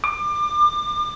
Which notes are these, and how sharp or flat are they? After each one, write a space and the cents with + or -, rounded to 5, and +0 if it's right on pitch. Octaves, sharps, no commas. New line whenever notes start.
D6 +30